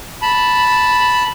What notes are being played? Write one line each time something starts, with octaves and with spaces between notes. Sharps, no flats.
A5 B5